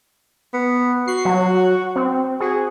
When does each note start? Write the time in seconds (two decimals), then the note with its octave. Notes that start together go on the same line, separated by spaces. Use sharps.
0.54 B3
1.08 F#4 C7
1.25 F#3
1.96 C4
2.40 F#4 G#4